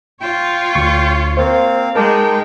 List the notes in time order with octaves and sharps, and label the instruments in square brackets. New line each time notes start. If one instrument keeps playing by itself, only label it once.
[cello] F4 C#5 [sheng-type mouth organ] G5
[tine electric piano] D2 C#6
[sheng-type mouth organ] A#3 C4 F5 [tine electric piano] C5
[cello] G#3 [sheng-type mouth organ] D#4 G5 [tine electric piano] A#4 A5 D6